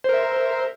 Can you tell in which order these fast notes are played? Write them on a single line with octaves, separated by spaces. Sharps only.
C5 A#4 E5